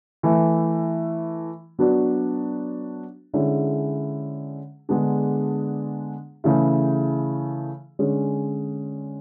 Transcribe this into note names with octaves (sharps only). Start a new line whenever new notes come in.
E3 A3 E4
F#3 B3 D4 F#4
D3 G#3 C#4 E4 G#4
D3 G#3 B3 D4 G#4
C#3 E3 A3 E4 G#4
D3 G#3 C#4